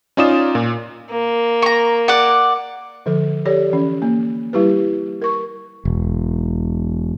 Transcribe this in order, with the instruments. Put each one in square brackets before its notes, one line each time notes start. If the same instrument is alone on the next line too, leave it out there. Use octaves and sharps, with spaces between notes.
[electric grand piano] C#4 D#4 F4 D5 D#6 E7
A#2
[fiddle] A#3
[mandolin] A#5 C#6
D5 F#5
[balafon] D3 F3 A4
G4 A4 C#5 D5
E3 C#4
A#3
G3 E4 G4 B4
A#4 C#6
[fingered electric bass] E1